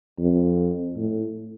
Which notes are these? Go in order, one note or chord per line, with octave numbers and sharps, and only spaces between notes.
F2
A2